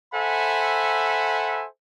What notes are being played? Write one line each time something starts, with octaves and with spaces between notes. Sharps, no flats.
A4 C5 E5 F#5 G#5 B5